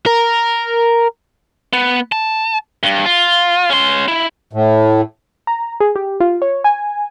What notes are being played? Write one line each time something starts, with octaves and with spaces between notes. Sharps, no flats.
A#4
B3
A5
G2
F4
C#4 C6
E4
A2
A#5
G#4
G4
F4
C#5
G#5